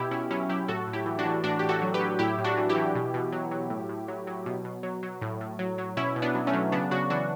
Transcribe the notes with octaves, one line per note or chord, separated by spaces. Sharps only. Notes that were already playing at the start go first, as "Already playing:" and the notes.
Already playing: B2 E4 G4
B2 C#4 E4
F#3 C#4 E4
F#3 E4 G4
A2 F#4 A4
A2
E4 G4
E3
D4 F#4
E3
A2 D4 F#4
A2 G4
F#4 A4
F#3
G4 B4
F#3
A2 E4 G4
A2
D4 F#4
E3
E4 G4
E3
B2
B2
F#3
F#3
A2
A2
F#3
F#3
B2
B2
F#3
F#3
A2
A2
F#3
F#3
B2 C#4 E4
B2
B3 D4
F#3
A3 C#4
F#3
C#3 B3 D4
C#3 D4 F#4
E3 D4 F#4